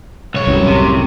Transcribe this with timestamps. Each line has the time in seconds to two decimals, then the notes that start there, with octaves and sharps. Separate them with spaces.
0.34 B1 C#5
0.47 C2 F#2 A2
0.67 C3